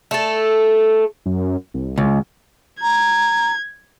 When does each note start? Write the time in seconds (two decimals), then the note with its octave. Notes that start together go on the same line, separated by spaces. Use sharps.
0.11 A3 A4
1.26 F#2
1.74 C2
1.98 C#2
2.82 A#5 G#6